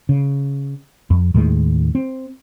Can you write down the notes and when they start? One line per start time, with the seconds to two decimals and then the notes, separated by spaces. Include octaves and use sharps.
0.09 C#3
1.10 F2
1.34 D#2 A2 D#3 G#3
1.95 C4